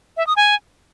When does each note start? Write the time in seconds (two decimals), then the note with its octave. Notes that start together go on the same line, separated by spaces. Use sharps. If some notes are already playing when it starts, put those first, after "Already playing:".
0.17 E5
0.27 D#6
0.37 G#5